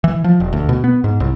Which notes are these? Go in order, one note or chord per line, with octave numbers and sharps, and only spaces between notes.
E3
F3
E1
D2
B2
B3
G#2
C2